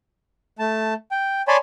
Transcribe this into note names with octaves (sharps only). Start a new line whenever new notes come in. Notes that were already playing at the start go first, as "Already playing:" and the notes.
A3 A5
G5
C#5 D5 G#5 A5 B5 C6